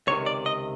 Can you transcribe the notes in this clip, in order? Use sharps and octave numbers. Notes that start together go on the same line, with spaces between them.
C#2 C3 D#3 C#5
D5
D#5